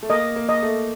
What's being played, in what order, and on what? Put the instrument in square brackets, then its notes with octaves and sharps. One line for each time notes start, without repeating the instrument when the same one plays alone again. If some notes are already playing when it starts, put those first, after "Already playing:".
[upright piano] A3
[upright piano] A#3 [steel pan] D#5
[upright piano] A#3
[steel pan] D#5
[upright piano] A3